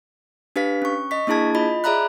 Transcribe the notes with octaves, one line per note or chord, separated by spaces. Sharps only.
D4 G4 B4 F5 B6
C#4 C#6
D#5 C#6 B6
A#3 D4 E4 G#4 A5 G#6
F4 D#5 B5
G#4 D5 E5 A#5 B5 F#6